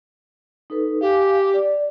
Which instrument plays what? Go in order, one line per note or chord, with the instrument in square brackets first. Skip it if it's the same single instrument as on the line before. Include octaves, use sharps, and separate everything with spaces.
[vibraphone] D#4 A4 B4
[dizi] G4 [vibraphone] F5 G#5
[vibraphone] D5